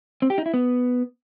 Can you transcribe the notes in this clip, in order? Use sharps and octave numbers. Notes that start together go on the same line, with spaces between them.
C4
G4
D#4
E4
B3